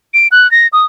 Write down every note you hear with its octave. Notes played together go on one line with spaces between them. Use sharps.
D7
F#6
A#6
D#6